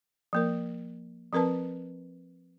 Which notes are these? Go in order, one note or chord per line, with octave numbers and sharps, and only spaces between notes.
F3 A#3 A#4
F3 C4 A#4 B4 A5